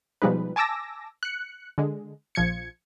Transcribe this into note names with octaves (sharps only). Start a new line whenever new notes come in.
B2 F3 G3 G#3 D#4 B4
G#5 A5 D6 E6 A#6
F#6 C#7
D3 G#3
A#1 F3 G#6 C#7